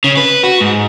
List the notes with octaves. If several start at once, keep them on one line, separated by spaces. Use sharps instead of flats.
C#3
B4
F#4
G#2